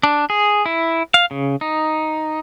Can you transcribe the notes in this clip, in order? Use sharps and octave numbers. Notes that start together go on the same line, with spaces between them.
D4
G#4
E4
F5
C#3
D#4